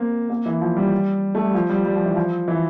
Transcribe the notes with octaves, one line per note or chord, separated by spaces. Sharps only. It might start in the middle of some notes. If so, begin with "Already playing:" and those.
Already playing: A#3 C4
A#3
E3
F3
G3
A3
G3
F3
G3
G3
F3
E3
F3
E3